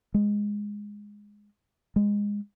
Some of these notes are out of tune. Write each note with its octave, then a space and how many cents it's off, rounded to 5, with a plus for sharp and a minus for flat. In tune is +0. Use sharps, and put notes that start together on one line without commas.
G#3 -10
G#3 -20